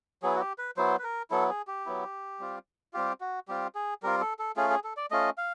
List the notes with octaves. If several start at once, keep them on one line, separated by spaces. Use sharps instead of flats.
F#3 B3 E4 G#4
F#4
G4
B4
F#3 B3 E4 C5
B4
A#4
F#3 B3 E4 A4
G#4
G4
F#3 B3 E4
G3 C4 F4
G3 C4 F4 G4
F#4
G3 C4 F4 G4
G#4
G3 C4 F4 A#4
A4
A4
A3 C#4 F4 G#4
G#4
A4
D5
A3 C#4 F4 D#5
F5